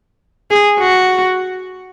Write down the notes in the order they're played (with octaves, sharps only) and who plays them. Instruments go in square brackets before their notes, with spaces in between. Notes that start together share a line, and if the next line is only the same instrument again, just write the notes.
[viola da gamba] G#4
F#4